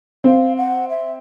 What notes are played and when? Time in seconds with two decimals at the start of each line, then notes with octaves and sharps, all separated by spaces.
0.24 C4 F5
0.56 F#5
0.89 E5